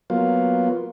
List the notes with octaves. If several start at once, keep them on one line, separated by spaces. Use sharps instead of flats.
F#3 A#3 B3 F4